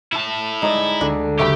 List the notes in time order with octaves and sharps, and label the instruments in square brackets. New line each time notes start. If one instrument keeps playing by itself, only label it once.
[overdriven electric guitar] E4 A5
[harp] G#3 [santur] D#4 D5
[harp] D2 [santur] D4
[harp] F#1 [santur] A3 B5 [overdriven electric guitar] G4 G5